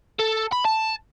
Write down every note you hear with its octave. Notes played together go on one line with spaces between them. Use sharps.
A4
B5
A5